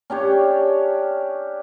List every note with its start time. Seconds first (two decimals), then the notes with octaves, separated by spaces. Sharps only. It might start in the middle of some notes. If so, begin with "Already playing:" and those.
0.10 C#4 D4 G4 C#5